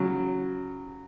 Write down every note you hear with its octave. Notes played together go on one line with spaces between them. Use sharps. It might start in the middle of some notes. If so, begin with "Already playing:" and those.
Already playing: C#3 F#3